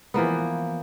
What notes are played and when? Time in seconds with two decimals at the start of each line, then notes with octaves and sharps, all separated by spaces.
0.14 E3 F3 A#3 B3